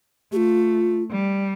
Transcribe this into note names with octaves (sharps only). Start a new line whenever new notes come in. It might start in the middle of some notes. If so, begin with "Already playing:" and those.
A3 F4 G4
G3